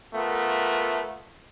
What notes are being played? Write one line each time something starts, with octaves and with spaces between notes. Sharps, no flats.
A3 B3 F4 A#4